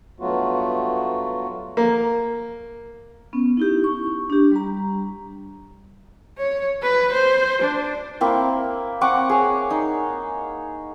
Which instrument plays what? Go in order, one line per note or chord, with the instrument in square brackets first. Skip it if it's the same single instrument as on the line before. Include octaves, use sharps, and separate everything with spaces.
[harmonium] G2 F#3 A3 B3 F4 F#4
[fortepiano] A#3
[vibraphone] B3 C#4
D#4 E4 G4
C#6
D4 G4
G3 A#5
[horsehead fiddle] C#5
B4
C5
D4
[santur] A#3 C4 E4
C4 F#5 C#6 D6
G#4 C#5
D#4